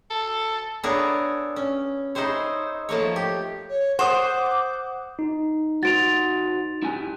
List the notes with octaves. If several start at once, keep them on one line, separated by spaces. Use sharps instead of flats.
A4
B3 D4 E4 G#4 A#4 C#5
C#4
D#4 E4 G#4 C5 C#5
F3 A3 A#3 C#5
G4
C#5
C5 F#5 D6 D#6
D#4
F#4 C5 A6 D7 F7
E4 G4 G#5